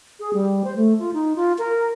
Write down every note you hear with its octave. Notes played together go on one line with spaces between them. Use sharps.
G#4
G3
C5
A3
F4
D#4
F4
A#4